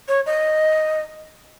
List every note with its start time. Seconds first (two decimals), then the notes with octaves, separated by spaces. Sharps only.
0.08 C#5
0.26 D#5